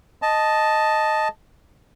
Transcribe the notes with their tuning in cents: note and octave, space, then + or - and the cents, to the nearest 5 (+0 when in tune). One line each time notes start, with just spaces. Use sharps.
D#5 +0 A5 -5